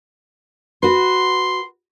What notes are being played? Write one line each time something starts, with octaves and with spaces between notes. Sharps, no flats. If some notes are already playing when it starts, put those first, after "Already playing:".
F#4 B4 C6